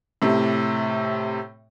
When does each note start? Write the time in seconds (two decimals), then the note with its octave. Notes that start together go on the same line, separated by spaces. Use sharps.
0.22 A2 C3